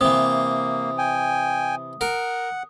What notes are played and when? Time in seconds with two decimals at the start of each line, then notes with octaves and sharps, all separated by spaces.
0.01 C3 E3 A#3 D#6
0.98 G5 G#5
2.01 A#4 F#5